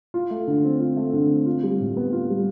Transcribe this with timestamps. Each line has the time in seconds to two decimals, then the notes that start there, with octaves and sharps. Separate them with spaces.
0.14 F4
0.31 A3
0.48 D3
0.64 C4
0.80 F4
0.97 A3
1.13 D3
1.30 C4
1.46 F4
1.63 G3
1.80 A2
1.97 B3
2.13 F4
2.30 G3